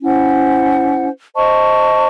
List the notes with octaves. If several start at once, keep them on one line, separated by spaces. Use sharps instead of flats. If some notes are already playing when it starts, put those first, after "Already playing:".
C#4 E4 C5 F#5
C5 D#5 A5 C#6